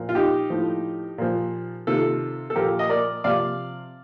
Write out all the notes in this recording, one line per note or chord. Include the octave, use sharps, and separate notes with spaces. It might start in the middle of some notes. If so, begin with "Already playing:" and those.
Already playing: A#2 F3
F4
D#4 G4
A2 F3
A#2 F3
C3 D#3 F4 A4
A4
A#2 F3 G4 A#4
D#5
A#4 D5
C3 F3 D5 F5